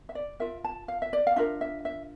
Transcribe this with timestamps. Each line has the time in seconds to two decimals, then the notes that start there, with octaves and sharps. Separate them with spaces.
0.09 E5
0.15 D5
0.40 F4 A#4 E5
0.64 A5
0.88 F5
1.02 E5
1.13 D5
1.27 F5
1.36 D4 F4 A#4 E5
1.61 E5
1.85 E5